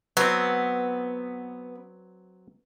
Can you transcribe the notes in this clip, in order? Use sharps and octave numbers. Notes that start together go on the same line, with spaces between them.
F#3 B3 C4